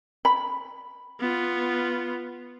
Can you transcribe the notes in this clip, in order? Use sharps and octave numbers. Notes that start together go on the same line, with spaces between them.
B5
B3 F4